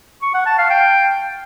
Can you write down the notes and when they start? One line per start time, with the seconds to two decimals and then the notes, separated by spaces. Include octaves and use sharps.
0.22 C#6
0.34 F#5
0.46 A5
0.58 F5
0.70 G5